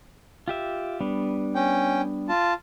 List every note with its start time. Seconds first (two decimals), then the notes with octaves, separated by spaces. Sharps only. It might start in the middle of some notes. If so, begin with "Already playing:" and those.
0.48 F4 G4 E5
1.00 G3 B3 D4
1.55 C#4 G5
2.29 F4 A5